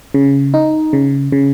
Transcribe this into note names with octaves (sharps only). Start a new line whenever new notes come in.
C#3
D#4
C#3
C#3